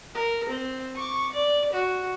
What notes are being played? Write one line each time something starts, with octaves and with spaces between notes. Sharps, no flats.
A#4
C4
C#6 D6
D5
F#4